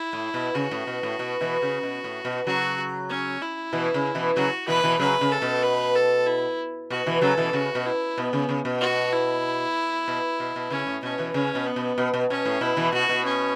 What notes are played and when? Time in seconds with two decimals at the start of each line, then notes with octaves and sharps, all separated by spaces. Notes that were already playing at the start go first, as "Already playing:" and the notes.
Already playing: E4
0.13 A2
0.34 B2
0.55 C#3 F#4
0.71 A2
0.87 B2
1.03 A2
1.19 B2
1.41 B2 E3
1.62 C#3
1.83 B2
2.04 A2
2.25 B2
2.46 C#3 F#3 F#4
3.09 C#4
3.41 E4
3.73 B2 E3
3.94 C#3
4.15 B2 E3
4.36 C#3 F#3 F#4
4.68 B2 E3 B4
4.84 B2 E3
4.99 C#3 F#3 B4
5.21 C#3
5.32 A4
5.42 B2
5.63 B4
5.96 A4
6.26 E4
6.90 B2 F#4
7.06 B2 E3
7.21 C#3 F#3 A4
7.38 B2 E3
7.53 C#3 F#4
7.75 B2
7.86 E4
8.18 B2 B3
8.33 C#3
8.49 C#3
8.65 B2
8.81 F#4
9.13 E4
10.08 B2
10.40 B2
10.56 B2
10.70 C#3 C#4
10.87 A2
11.03 B2 C#4
11.18 B2 E3
11.34 C#3 C#4
11.55 B2
11.67 B3
11.76 B2
11.98 B2
12.14 B2
12.30 B2 C#4
12.46 A2
12.61 B2 E4
12.77 B2 E3
12.93 B2 F#4
13.09 B2
13.25 C#4